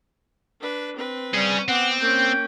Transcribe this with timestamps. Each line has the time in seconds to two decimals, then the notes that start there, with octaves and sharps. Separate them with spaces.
0.61 D4 B4
0.96 C4 B4
1.34 G3 C#4 G#4
1.68 B3 C4 F#5 D6
2.00 A#3 C#4 G5